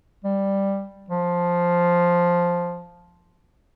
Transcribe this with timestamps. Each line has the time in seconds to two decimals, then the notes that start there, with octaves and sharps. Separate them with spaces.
0.25 G3
1.10 F3